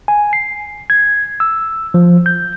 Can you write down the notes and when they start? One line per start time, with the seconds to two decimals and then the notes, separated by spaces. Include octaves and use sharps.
0.08 G#5
0.33 C7
0.90 G#6
1.40 E6
1.94 F3
2.26 G6